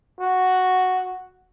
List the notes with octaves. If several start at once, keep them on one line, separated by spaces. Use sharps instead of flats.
F#4